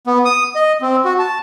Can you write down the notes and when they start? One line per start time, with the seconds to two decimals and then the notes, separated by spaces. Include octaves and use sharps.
0.07 B3
0.25 D#6
0.55 D#5
0.81 C4
1.05 F#4
1.19 A5